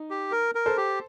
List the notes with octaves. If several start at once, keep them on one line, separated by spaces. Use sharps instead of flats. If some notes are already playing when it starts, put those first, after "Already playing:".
Already playing: D#4
G4
A#4
A#4
A4 C5
G4